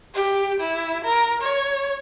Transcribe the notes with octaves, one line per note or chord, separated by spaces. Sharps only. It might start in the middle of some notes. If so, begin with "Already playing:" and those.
G4
E4
A#4
C#5